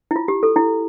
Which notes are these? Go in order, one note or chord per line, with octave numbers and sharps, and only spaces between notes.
E4
F4
G4
A4
E4